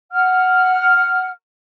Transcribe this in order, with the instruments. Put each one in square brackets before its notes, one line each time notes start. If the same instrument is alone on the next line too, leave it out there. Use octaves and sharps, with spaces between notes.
[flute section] F#5 F6